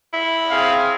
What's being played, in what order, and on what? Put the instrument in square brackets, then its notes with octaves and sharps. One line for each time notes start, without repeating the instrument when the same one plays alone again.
[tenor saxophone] E4
[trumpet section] C4 G#4 F5